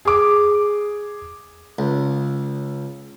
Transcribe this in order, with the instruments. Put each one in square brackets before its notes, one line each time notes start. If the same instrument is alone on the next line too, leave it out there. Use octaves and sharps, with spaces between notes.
[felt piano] G#4 D6
[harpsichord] C#2